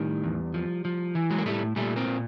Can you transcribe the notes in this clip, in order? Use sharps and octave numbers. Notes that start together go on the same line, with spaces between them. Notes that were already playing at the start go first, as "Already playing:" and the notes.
Already playing: A2 D#3 G3
E2
F3
F3
E3
F#3 G#3
A#3
A2 G3 A3
A#2 G3 A3
A#3 C4
A#2